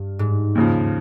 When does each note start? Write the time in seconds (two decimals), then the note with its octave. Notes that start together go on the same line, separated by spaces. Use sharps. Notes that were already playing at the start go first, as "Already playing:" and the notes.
Already playing: G2
0.19 G#2
0.55 D#2 C#3 F3